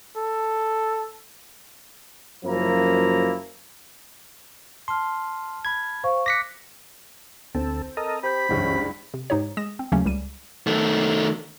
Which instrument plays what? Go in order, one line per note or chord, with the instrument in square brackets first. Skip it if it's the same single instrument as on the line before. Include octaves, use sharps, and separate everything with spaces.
[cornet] A4
[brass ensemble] F#1 F#2 F3 A#3 E4 A#5
[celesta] A5 F6 [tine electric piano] C6
[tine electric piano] B5 G#6
[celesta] C5 F5 C#6
[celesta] D6 F#6 [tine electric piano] A#6 B6 C#7
[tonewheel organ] D2 A4 [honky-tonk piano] C4
[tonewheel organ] A4 A#4 D#5
[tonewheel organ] G4 [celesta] C5 G6 B6 [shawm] B5
[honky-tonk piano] F#1 C#2 G2 [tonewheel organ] E3 C#4
[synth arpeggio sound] C3
G#2 D#4 G4 C#5
G#3 D#6 A#6 E7
C4
D#2 C#3 F#3 A3 A#3 C#4
C#2 G3 D#7
[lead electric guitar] D#3 A3